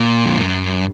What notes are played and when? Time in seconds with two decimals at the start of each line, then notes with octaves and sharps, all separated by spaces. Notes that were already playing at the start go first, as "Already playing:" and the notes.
Already playing: A#2
0.25 F2
0.37 F#2